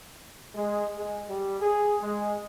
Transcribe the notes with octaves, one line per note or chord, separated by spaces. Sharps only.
G#3
G#3
G3
G#4
G#3